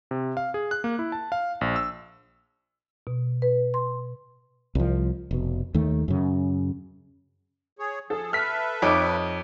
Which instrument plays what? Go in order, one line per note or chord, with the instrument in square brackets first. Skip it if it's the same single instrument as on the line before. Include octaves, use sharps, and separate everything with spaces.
[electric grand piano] C3
F5
G#4
F#6
A#3
E4
A5
F5
A#1
E6
[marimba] B2
B4
C6
[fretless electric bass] C2 F3
F1 B2
D#2 D#3 A3
F#2 C#3
[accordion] G#4 C#5
[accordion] F3 G#4 [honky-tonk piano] A4
[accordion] A4 B4 E5 [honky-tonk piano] F6 B6
[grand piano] F2 C#5 D6 [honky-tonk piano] D#4 D7